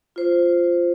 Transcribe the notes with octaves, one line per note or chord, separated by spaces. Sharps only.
F4 C5